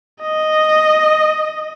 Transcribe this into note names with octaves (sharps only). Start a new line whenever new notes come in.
D#5